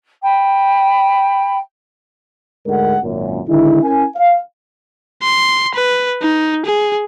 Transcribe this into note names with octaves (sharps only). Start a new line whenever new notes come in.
G5 B5
D2 G#2 D3 G#3 A#4 F#5
G#1 F#2 A#2
D3 D#3 G#3 E4
C#4 E4 A#4 G#5
F5
C6
B4
D#4
G#4